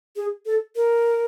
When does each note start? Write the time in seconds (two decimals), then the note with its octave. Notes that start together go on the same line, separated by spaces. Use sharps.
0.16 G#4
0.46 A4
0.76 A#4